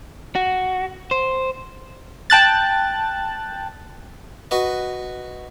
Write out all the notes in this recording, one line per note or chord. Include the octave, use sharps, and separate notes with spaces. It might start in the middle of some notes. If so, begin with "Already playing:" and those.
F#4
C5
G5 A5 F#6 A6
F#4 B4 D#5